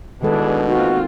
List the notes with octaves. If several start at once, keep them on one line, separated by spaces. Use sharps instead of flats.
B2 D#3 E3 G#3 D4 G#4 A4
A#3 C4 D#4 F4 F#4